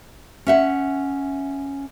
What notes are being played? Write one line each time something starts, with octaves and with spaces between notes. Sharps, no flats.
C#4 E5 F#5